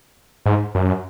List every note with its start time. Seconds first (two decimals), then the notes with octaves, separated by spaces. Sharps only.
0.46 G#2
0.75 F#2